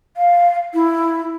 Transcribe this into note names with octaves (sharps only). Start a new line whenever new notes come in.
F5
E4